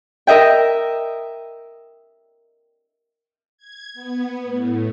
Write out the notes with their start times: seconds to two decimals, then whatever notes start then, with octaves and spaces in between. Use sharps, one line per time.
0.27 A#4 D#5 E5 G5
3.58 G#6
3.94 B3
4.44 A2